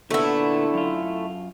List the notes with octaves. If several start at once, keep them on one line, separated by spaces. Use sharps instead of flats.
A#2 D3 A3 B3 E4
F#2 F4